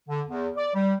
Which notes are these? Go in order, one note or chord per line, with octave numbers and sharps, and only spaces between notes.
D3
E2
D5
G3